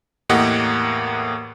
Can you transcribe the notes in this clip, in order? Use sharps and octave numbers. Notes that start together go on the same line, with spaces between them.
E2 A2 A#3 G4 D#5 F#5